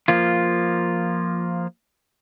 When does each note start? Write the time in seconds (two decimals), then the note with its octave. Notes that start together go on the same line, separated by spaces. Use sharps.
0.08 F3 A#3 F4